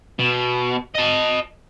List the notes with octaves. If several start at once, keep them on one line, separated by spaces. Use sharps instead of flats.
B2
D#5 A5